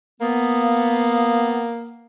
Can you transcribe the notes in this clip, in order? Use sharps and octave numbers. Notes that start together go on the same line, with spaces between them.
A#3 B3
F5